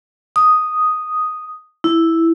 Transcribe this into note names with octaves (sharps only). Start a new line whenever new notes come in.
D#6
E4